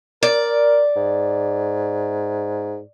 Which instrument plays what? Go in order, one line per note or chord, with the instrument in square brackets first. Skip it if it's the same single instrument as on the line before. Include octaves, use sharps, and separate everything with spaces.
[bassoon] A#4 [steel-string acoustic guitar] D5
[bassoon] G#2